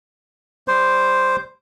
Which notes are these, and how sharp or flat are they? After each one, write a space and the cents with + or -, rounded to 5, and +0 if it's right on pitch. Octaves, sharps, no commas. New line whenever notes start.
G3 +0 C5 +0 D6 +0